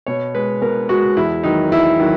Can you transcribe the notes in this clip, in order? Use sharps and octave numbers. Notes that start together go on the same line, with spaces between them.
B2 C#5
G#3 B4
B2 A#4
G#3 F#4
E2 E4
D#3 F#3 D#4
E2 E4
D#3 F#3